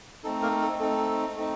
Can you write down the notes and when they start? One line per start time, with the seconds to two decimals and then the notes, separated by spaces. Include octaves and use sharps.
0.24 A3 C4 D#4 A4
0.42 A#3 A#4
0.61 A4
0.80 A3 C4 D#4 A4
1.36 A3 C4 D#4